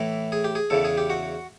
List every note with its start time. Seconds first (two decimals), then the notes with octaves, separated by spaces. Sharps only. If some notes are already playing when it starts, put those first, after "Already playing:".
Already playing: A2 E3
0.32 G#4
0.44 G4
0.55 G#4
0.70 E2 C#3 E3 A4
0.84 G#4
0.97 G4
1.10 F#4